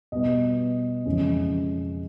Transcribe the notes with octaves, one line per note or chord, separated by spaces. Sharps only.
B2 G3 B3 D#5
F2 C#3 E3 G#3 C#4